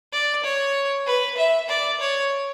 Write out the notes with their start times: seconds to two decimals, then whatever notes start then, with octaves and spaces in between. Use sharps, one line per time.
0.13 D5
0.44 C#5
1.07 B4
1.37 E5
1.69 D5
2.00 C#5